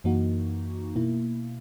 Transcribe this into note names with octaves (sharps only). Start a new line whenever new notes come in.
F#2 E3 A#3 D#4 F#4
B2 A#3 E4